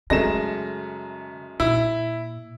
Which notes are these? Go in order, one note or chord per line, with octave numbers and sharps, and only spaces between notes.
F#2 C#3 G#3 A3 A#6 E7
A#2 E4